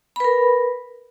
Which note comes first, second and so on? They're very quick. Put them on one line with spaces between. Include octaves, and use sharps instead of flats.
B5 B4 A#4